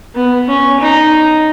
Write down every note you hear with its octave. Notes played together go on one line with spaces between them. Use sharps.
B3
C#4
D#4